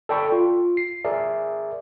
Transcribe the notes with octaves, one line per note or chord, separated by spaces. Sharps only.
A4 D5 G5 B5 C#6
F4
C7
G#4 A#4 D5 E5